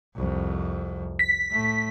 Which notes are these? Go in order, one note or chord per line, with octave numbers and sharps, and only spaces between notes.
C2 F2
B6
A2 A3